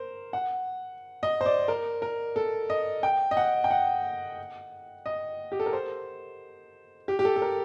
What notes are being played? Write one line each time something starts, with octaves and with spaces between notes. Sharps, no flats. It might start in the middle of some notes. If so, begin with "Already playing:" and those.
Already playing: A#4 C5
F#5
D#5
C5
D5
A#4
A#4
A4
D#5
G5
D#5
F#5
G5
F#5
D#5
G4
A4
A#4
C5
G4
G4
A4
A4
A#4